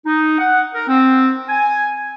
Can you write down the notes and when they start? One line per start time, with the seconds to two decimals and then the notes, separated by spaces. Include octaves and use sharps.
0.06 D#4
0.39 F#5
0.74 A#4
0.87 C4
1.49 G#5